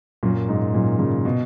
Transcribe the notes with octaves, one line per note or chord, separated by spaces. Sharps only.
F#2 A#2
G#2
F#2 A#2
A#2 C#3
B2